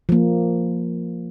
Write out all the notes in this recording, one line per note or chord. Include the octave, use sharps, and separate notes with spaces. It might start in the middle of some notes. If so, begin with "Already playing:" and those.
F3 A#3